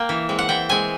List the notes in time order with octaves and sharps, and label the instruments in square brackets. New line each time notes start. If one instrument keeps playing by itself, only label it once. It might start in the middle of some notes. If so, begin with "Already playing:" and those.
Already playing: [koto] A#3 G5
E3
G#3 C4
F#5
E3 G5
G#3 C4 G#5